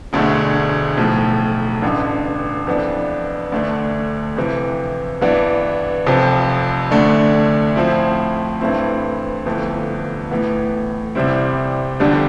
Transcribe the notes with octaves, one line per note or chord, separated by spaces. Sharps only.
E1 D2 D3 A3
B1 A2 F3
A1 G2 D3
F2 E3 B3 D4
D2 D3 A3 D4
F2 C3 E3
G2 E3 B3 D4
F1 F2 C3 F3
D2 D3 A3 D4
A2 F3 C4 E4
G2 E3 A3 C4 E4
G1 F2 E3 A3
A2 E3 B3 E4
C2 C3 G3 C4 E4
G1 F2 D3 G3 D4